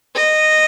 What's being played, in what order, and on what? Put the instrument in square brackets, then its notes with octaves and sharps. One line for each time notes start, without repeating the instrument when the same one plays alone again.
[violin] D#5